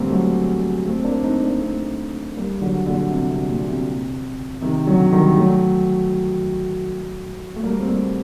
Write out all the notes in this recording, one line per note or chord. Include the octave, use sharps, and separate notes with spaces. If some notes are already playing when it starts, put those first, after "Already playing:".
Already playing: A#2 D3 G3 A3 A#3 C4
F#3 A3
A3 C4
C4
A#3 D4
C4 D#4
A#3 D4
A3 C4
G3 A#3
D3 F#3
A#2 D3
C3
C3
A#2
C3
C3 D#3
D3 F#3
D#3 G3
F#3 A3
A3
G3 A#3
C4
G3 A#3